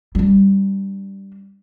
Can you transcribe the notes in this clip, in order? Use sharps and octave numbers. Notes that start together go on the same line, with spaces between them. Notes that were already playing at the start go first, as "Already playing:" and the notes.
G3 D4